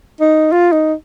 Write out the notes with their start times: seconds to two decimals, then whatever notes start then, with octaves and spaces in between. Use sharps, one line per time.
0.20 D#4
0.52 F4
0.72 D#4